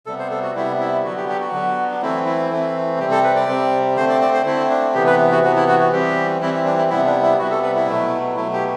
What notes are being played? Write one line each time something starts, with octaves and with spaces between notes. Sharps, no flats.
C3 G3 B3 A4
C5
A4
F#4
C3 G3 B3 E4
E4
D3 F#3 B3 F#4
G4
G4
F#4
D3 F#3 B3
D4
E3 A3 C4 E4
E4
E3 A3 C4
C3 G3 C4 G4
A4
B4
D5
C3 G3 C4
D3 A3 C4 C5
D5
D5
C5
D3 A3 C4 E4
D4
C3 E3 B3 G4
B4
F#4
C3 E3 B3 F#4
E4
F#4
F#4
E3 G3 C4 G4
E3 G3 C4 E4
E4
D4
E4
C3 G3 B3 E4
D4
E4
C3 G3 B3 F#4
A4
B4
E4
B2 F#3 A3
B2 F#3 A3 E4
G4